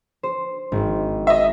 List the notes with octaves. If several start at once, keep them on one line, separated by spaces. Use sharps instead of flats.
C5
G#1
D#5 E5